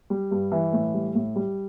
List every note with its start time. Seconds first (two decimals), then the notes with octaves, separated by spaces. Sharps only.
0.10 G3
0.31 G2
0.52 E3
0.73 A2
0.94 G3
1.15 A2
1.36 G3